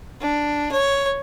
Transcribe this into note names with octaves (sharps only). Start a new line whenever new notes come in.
D4
C#5